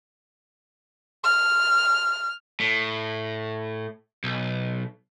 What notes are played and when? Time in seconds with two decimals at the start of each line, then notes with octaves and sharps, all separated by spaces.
1.24 F6
2.60 A2
4.24 B1